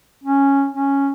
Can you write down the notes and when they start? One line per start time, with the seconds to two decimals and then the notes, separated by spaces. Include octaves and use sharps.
0.24 C#4
0.72 C#4